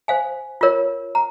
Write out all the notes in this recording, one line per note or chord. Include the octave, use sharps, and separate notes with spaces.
C5 F5 G#5
F4 A#4 C#5
A#5